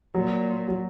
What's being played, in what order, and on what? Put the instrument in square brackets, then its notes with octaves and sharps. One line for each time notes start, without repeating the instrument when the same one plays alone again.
[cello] A#2 [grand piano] F#3
[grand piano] F#3